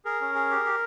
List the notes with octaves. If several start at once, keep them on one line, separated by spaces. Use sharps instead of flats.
G#4 A#4
C#4
G#4
G4
G4